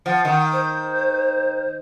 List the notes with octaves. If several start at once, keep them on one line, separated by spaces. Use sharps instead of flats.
F3 F#5
D#3
C5